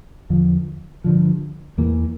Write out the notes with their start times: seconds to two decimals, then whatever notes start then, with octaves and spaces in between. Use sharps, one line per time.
0.30 E2 D3 F3
1.04 G2 D3 F3
1.78 E2 E3 A#3